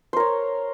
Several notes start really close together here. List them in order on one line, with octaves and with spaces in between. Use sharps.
C5 A#4 C#5